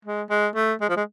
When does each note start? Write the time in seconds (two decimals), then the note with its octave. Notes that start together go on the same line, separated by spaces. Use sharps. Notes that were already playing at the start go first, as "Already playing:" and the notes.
0.05 G#3
0.30 G#3
0.55 A3
0.81 G#3
0.89 F3
0.97 G#3